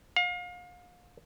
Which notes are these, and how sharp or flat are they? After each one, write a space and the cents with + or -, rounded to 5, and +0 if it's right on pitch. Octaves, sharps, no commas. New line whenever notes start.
F5 +35